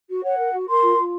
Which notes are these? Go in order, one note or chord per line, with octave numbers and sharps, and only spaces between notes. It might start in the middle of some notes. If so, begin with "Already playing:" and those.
F#4
C#5 F#5
A#4
F#4
A#4 C6
F4
F4